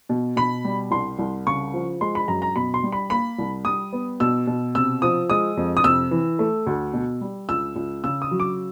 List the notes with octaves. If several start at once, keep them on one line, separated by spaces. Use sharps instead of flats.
B2
B2 B5
G3
C2 C6
C2
C#3 C#6
F3
G#3 C6
B5
F#2 A#5
A#5
B2 B5
C6
G3
B5
A#3 B5
C2
G3 D#6
B3
B2 E6
B2
C3 E6
F3 D#6
G#3 D#6
F2
D#6
C3 E6
E3
A3
D2
B2
G3
C#2 E6
C#2
C#3 E6
D#6
F#3
D6